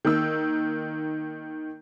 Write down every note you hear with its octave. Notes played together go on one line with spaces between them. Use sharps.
D#3 A#3 E6